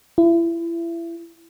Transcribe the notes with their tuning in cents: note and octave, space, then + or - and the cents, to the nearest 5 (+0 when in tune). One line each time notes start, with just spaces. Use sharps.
E4 +30